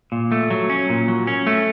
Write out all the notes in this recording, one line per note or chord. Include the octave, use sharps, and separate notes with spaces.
A#2
A3
F#3
C#4
A#2
F#3
C#4
A3